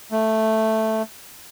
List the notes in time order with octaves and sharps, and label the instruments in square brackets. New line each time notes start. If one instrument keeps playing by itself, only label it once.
[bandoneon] A3